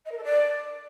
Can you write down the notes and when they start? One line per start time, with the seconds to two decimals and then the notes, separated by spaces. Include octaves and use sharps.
0.05 D#5
0.11 A#4
0.17 A4
0.23 D5